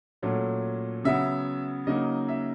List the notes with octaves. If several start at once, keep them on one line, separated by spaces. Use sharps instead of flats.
A#2 F#3 A3 C#4
C#3 F#3 B3 E5
C#3 F#3 A#3 D#4 D#5
E5